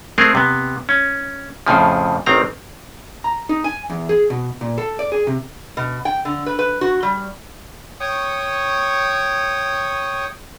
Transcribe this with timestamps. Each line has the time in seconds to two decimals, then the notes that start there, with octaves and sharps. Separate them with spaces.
0.18 G#3 A3 C4 G#4 A#4
0.35 C3 B3
0.89 C#4
1.67 F2 A2 C#3 F3
2.26 A1 D#3 C4 A#5
3.24 A#5
3.49 D#4
3.64 G#5
3.90 E2
4.09 G#4
4.30 B2
4.61 A#2
4.78 A4
4.99 D5
5.12 G#4
5.27 C3
5.77 B2
6.05 G5
6.25 D3
6.46 B4
6.59 B4
6.81 F#4
7.03 G3
8.00 C#5 G5 C#6 D#6